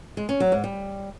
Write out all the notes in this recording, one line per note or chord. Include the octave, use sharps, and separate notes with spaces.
G#3
C#4
F#3
G#2
G3